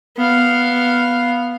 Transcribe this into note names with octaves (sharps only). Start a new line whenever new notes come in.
B3 F5